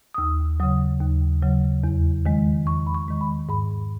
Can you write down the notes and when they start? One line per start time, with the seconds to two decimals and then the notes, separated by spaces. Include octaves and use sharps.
0.14 D#6
0.18 D#2 E6
0.60 C#3 F#3 D#6
1.01 D#2
1.42 C#3 F#3
1.84 E2
2.26 D#3 G#3
2.66 E2 C#6
2.87 B5
2.95 C#6
3.08 D#3 G#3 C#6
3.21 B5
3.49 G#2 B5